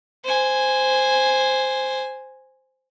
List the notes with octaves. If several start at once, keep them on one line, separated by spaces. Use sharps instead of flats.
C5 G#5